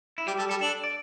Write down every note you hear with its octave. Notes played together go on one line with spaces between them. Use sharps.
E4
G3 G4
G3 A4
G3 A4
D4 A4
D5